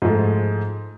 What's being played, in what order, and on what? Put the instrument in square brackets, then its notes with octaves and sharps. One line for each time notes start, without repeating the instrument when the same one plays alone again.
[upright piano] G#2 F3 G#3 A3